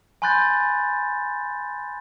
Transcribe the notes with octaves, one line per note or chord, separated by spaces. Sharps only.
G#5 B5 C6 F#6 G6 A6